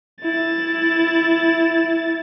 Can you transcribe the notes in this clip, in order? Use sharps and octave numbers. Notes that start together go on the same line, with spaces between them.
E4 A6